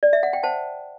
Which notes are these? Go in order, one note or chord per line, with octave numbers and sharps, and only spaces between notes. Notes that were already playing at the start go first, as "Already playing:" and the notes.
D5
E5
F#5
G5
C5 F#5 A5